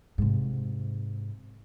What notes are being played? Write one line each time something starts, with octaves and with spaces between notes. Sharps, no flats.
G#2 C3